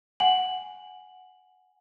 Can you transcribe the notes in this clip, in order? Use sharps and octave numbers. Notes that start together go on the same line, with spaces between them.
F#5 G#5 F#7